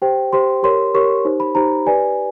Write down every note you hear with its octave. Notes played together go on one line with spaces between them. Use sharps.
G4 C5 G5
G4 C5 C6
G4 A#4 C#5 C6
G4 A#4 C#5 C#6
D#4 G4 C5
B5
D#4 G4 C5 A#5
G4 B4 D5 G#5